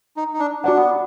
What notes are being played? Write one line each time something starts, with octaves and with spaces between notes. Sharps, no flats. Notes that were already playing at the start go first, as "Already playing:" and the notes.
D#4
D#4
D4
D4 F#4 D5 F#5
B3